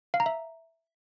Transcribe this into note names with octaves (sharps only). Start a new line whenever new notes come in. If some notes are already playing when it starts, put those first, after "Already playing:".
F5
A#5
E5